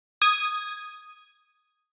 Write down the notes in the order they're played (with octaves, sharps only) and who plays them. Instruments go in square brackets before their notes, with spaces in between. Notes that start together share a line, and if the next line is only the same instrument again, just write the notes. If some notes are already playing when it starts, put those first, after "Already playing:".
[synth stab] D#6 G#6